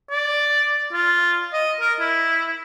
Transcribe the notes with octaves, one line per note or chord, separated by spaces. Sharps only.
D5
F4
D#5
A#4
E4